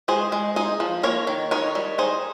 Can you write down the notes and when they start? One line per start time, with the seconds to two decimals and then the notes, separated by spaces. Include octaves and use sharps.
0.08 G#3 G#4 C5
0.32 G#3
0.56 D#4 G#4 C5
0.80 F3
1.03 A#3 A#4 C#5
1.27 D#3
1.51 D#4 A#4 C#5
1.75 G3
1.98 D#4 G#4 C5